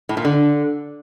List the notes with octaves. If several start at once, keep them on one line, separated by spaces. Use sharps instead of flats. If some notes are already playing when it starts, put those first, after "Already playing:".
A2
A#2
D3